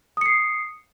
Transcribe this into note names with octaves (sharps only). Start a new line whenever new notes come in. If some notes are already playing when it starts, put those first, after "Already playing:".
D#6 C7 C#7